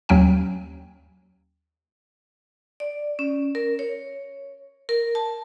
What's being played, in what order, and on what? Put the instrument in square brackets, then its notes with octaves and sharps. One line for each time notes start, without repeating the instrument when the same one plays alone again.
[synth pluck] D#2 F#3 C#4 G5 G#5
[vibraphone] D5
C#4
A#4
C#5
A#4
A5